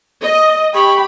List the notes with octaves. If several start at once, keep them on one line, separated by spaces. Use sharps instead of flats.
D#5
G4 B5 C#6